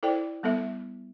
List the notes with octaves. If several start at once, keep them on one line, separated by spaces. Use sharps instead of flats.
E4 A4 C5 D5 G5
G3 B3 A4 E5